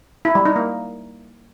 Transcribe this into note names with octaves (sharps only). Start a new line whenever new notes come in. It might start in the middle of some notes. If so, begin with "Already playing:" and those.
E4
G3
D#4
A#3